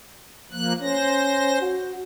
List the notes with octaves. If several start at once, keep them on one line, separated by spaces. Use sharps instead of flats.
F3 A#3 F#6
C#4 C5 A#6
F#4